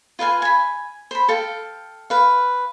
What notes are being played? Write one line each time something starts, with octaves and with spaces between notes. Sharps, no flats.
F4 B4 F5 G#5
G#5 B5
C5 B5
A4 F5 G5
B4 F5